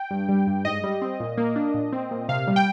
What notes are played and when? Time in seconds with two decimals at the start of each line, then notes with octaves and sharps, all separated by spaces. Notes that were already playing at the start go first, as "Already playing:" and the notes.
Already playing: G5
0.11 G2
0.29 G3
0.47 G2
0.65 G#2 D#5
0.84 G3
1.02 C4
1.20 A#2
1.38 A#3
1.56 D4
1.74 A#2
1.93 C4
2.11 A#2
2.29 C3 F5
2.48 G3
2.56 G5